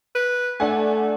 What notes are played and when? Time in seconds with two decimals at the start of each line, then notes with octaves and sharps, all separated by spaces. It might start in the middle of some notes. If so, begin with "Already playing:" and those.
0.15 B4
0.60 A3 D4 F#5 G#5